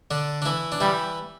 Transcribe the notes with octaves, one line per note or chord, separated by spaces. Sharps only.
D3 D4
D4
E3 E4
D4
E3 G3 E4